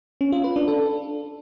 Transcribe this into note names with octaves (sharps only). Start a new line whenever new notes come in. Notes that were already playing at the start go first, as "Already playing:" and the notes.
C#4
F4
B4
D4
A4